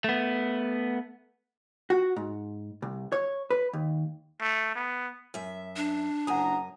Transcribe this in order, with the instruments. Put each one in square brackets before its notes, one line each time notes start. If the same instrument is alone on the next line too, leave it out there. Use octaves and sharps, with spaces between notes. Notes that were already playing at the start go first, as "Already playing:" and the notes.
[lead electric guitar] A3 B3
[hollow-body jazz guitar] F#4
G#2
C2
C#5
B4
D#2
[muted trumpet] A3
B3
[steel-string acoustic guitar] F#2 E5
[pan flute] D4
[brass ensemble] F#1 A#5 [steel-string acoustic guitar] F#2 G#5 [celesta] F#5 D#6